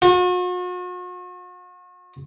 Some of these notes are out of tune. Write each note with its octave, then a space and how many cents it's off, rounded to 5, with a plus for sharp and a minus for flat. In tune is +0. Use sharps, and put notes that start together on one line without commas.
F#4 -45